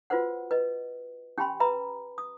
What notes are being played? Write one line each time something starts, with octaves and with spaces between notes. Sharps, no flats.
F4 F#4 B4 C5 F#5
B4 D#5
C#4 G4 G5 G#5 B5 C6
B4 E5 A#5 B5
D#6